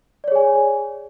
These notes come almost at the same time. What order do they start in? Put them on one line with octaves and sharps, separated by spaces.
D5 C#5 G#4 G#5